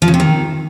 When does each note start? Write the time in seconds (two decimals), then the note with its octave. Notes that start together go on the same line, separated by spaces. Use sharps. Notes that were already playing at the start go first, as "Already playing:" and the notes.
0.02 F3
0.08 C#3
0.14 C3
0.20 D#3